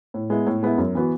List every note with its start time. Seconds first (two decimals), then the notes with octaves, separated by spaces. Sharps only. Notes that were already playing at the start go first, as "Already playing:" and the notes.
0.14 A2
0.30 G#3 B3 E4
0.47 A2
0.63 G#3 B3 E4
0.78 F#2
0.95 E3 B3 F#4